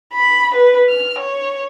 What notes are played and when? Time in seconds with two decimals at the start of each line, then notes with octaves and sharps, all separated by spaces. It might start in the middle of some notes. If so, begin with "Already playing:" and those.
0.14 B5
0.54 B4
0.89 F6
1.19 C#5